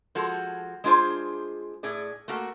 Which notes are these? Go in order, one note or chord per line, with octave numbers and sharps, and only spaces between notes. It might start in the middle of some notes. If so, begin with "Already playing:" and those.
F3 G#3 F#4 A4
G#3 D4 F4 G#4 C5
A2 G#4 D5
A3 A#3 F#4